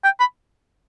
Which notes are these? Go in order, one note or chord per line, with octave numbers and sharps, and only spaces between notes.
G5
B5